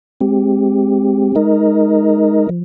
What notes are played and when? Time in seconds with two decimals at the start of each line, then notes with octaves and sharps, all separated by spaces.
0.21 G#3 C4 G4
1.35 G#3 D#4 A#4 D#5
2.49 F3